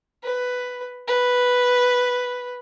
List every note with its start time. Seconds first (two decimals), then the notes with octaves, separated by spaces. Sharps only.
0.23 B4
1.08 B4